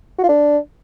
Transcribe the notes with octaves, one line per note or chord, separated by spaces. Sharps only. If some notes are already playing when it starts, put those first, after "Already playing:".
F#4
F4
D4